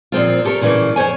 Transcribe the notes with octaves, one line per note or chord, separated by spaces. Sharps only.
A#2 F3 C4 F4
G4 A4 A#4 C5 C#5
A#2 C#3 E3 F3 A3 A#3
F2 C5 C#5 G#5